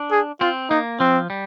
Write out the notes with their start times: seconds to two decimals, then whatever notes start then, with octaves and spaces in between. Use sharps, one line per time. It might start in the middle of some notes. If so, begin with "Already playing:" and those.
Already playing: D4
0.11 G#4
0.41 C4 F4
0.70 A#3 D#4
1.00 F3 C4
1.30 G3